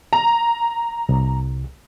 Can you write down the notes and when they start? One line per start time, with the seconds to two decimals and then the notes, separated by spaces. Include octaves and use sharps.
0.13 A#5
1.09 C2